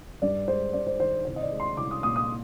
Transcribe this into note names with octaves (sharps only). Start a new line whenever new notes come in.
G2 D5
G#3 C5
G2 D5
C5
D#3 C5
D5
C2 C5
D#5
D5
G#3
C6
C2 D6
D#6
A#2 D#6
D#6